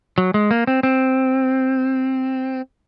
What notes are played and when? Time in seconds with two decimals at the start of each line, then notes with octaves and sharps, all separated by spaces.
0.18 F#3
0.34 G#3
0.51 A#3
0.67 C4
0.83 C4